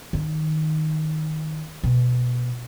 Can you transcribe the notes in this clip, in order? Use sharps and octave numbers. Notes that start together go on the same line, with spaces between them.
D#3
B2